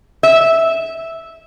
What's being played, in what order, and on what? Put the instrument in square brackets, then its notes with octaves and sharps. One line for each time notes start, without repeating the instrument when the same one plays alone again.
[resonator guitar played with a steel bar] E5